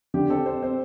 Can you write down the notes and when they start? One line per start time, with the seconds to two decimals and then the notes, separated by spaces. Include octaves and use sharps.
0.14 D3 G4
0.29 C4 A4
0.46 C4 C5
0.62 C4 C5